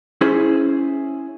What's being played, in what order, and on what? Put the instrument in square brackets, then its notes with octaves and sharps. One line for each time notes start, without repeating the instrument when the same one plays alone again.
[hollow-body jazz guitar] C#4 E4 G#4 C5